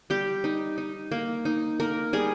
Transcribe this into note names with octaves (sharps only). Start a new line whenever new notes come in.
G3 G4
D#4
D#4
A#3
D#4
A#3 A#4
G3 G#4